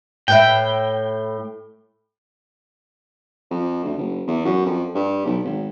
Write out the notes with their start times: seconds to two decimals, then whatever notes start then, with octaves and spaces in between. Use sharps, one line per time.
0.28 A2 B4 E5 G5
3.51 F2
3.84 D2
3.98 F#1
4.28 E2
4.45 F#2
4.66 F2
4.95 G2
5.25 B1
5.44 G#1